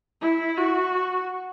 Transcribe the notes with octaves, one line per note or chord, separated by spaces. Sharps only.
E4
F#4